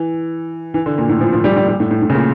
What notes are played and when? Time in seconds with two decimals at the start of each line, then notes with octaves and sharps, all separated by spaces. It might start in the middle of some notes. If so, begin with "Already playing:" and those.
Already playing: E3
0.74 E3
0.86 D3
0.98 A#2
1.09 A2
1.21 F3
1.33 F3
1.44 G3
1.56 G3
1.68 G3
1.80 A2
1.91 A2
2.02 A2
2.10 C#3
2.14 A#2